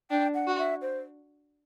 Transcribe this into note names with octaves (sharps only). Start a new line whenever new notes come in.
D4 G5
F#5
F#4
E5
C5